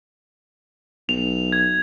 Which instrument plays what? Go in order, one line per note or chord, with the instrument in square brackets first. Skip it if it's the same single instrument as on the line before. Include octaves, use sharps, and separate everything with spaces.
[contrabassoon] B1 [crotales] F7
[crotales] G#6